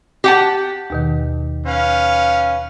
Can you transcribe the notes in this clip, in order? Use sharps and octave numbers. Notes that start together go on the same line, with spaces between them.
G4 F#5 A5
D#2 B2 D#3
C#4 B4 F5